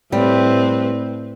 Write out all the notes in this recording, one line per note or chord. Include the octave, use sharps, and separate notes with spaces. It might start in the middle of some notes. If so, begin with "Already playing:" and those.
A2 G3 C4 B4